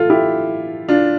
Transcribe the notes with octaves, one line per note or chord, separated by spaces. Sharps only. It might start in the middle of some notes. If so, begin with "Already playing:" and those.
Already playing: A2 E3 F4 A4
E4 G4
D4 F4